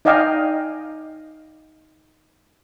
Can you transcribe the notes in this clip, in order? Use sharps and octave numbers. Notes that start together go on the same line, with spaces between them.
D#4 D5 D#5 F5 G5 G#5